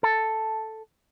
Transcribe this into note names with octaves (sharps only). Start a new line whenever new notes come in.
A4